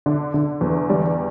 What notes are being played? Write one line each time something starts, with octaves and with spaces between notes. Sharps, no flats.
D3
D3
E2
G3